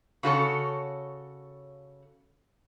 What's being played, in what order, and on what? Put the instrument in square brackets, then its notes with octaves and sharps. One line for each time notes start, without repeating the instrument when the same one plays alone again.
[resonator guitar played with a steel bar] C#3 F#4 A4 C#5